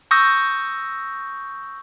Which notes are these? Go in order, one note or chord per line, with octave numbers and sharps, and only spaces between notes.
C#6 D#6 E6 G6 A#6